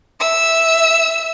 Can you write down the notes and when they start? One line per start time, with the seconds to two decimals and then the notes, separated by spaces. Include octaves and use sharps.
0.20 E5 E6